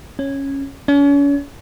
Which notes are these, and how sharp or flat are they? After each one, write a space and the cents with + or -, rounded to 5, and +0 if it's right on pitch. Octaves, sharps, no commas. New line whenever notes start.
C#4 -10
C#4 +40